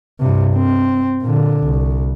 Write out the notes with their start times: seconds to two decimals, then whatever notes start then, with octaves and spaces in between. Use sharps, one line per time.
0.19 G2 C3
0.55 C4
1.22 A#2 D3
1.64 C2